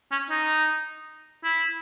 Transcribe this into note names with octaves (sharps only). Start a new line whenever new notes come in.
C#4
D#4
E4